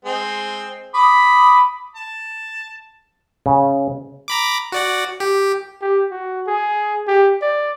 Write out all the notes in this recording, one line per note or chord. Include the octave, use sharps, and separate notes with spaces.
G#3 C4
B5 D6 D#6
A5
C#3
A#5 B5 D6
F#4 D5 F#5
G4
G4
F#4
G#4
G4
D5